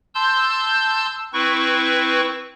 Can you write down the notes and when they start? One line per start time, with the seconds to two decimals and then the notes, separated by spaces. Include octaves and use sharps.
0.15 A5 C6 E6 G6
1.33 C4 E4 B4 C#6